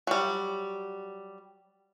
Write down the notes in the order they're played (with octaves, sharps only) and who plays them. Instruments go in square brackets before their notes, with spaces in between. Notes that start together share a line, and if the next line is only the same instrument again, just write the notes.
[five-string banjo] F#3 G3